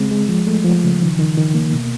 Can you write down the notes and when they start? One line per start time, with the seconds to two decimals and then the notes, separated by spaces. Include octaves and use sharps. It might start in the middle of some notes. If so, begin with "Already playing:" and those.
Already playing: C#3 G#3 C4
0.11 G#3
0.28 F3
0.47 A3
0.65 F3
0.83 C#3
1.02 D#3
1.19 D#3
1.38 D#3
1.54 A#3
1.73 B2